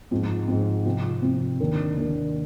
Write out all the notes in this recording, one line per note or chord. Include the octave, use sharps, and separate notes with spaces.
G#2 F3 C4
G#2 F3 C4
C3 F3 C4
C3 F3 C4
D#2 D#3 A#3 D4
D#2 D#3 A#3 D4